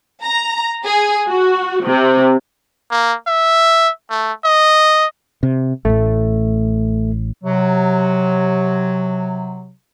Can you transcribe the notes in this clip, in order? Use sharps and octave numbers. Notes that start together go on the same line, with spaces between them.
A#5
G#4
F#4
C3
A#3
E5
A3
D#5
C3
A1 A2 A3
C3 F#3